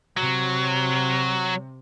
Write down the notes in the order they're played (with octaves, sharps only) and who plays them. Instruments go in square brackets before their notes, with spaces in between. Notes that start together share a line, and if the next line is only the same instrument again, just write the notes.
[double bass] C3 [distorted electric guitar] F#3